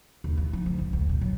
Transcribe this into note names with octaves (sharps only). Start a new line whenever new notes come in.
D#2
E3
F3
D2
F#1
D2
A#2
F#3